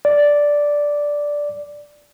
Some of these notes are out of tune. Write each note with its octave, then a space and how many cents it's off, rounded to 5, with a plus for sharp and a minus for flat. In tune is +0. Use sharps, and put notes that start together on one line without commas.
D5 -5